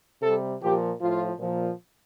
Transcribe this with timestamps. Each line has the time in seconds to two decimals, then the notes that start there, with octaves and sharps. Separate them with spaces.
0.22 C3 G3 A4
0.61 A#2 F3 G4
0.99 A2 F3 F4
1.38 A#2 F3